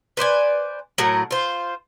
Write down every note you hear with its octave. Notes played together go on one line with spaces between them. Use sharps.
B4 C5 D5 G#5
A2 F#3 A#4 F#5
F4 C5